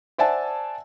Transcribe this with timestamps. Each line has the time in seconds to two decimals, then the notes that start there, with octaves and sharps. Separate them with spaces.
0.18 C5 D5 E5 F#5 G#5 A5